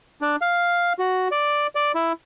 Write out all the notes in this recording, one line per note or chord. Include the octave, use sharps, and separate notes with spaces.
D4
F5
F#4
D5
D5
E4